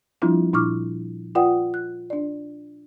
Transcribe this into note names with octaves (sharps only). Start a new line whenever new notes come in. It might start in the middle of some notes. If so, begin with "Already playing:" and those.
F3 G3 C4 D4 E4 F4
A#2 D4 E4 C#6 D6 F6
F4 B4 D5 F#5 G5 D#6
F#6
D4 D5